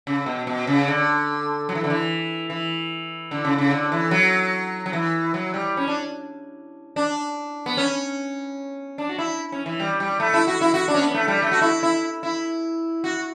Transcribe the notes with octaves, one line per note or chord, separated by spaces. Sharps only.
C#3
B2
B2
C#3
D3
F#3
E3
D3
E3
E3
D3
C#3
C#3
D3
E3
F#3
F#3
E3
F#3
G3
C#4
D4
D4
B3
C#4
D4
F#4
E4
C#4
E3
G3
G3
A3
E4
F#4
E4
F#4
D4
C#4
B3
A3
G3
A3
F#4
E4
E4
E4
F#4